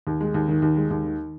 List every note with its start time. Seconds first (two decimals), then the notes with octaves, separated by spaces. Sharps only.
0.07 D#2
0.21 G#3
0.34 D#2
0.48 D#3
0.62 D#2
0.77 G#3
0.90 D#2
1.05 D#3